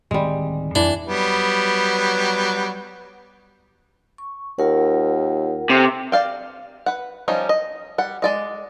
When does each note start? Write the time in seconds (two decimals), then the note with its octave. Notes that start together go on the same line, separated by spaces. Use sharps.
0.11 D1 D#3 G3 G#3 C4
0.75 F2 E3 D4
1.06 F#3 G3 B3
4.18 C#6
4.59 D#2 F4 A#4 F#5
5.70 C3 A4
6.12 D5 F5 G5
6.86 B4 F#5
7.28 F3 G3 C#4 D#4
7.49 D#5
7.98 G3 F#5
8.22 G#3 D5 D#5